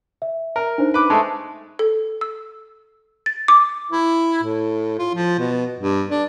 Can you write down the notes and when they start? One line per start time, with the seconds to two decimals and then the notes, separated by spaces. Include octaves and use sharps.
0.22 E5
0.56 A#4
0.78 D4 D#4 C5
0.94 B4 D6
1.10 G#3 A3 A5
1.79 A4
2.21 E6
3.26 A6
3.48 D6
3.91 E4
4.43 A2
4.99 F4
5.15 F3
5.39 B2
5.79 G2
6.10 D4